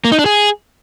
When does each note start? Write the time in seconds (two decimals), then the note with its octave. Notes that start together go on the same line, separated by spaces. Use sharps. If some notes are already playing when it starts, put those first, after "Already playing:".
0.05 A#3
0.12 D#4
0.19 D4
0.26 G#4